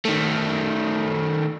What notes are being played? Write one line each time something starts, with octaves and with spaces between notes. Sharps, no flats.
D#3 A3